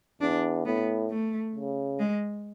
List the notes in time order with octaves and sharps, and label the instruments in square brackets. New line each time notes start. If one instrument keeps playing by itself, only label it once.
[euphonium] E2 [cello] D4
[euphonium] A2 [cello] B3
[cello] A3
[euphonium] C#3
[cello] G#3